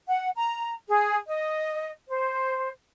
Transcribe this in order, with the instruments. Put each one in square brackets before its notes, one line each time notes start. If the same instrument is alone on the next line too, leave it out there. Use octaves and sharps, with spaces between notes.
[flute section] F#5
A#5
G#4
D#5
C5